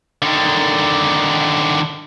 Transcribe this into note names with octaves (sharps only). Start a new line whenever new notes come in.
D3 D#3